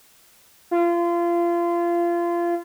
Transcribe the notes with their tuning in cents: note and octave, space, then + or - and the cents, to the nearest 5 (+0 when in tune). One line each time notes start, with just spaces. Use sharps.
F4 -25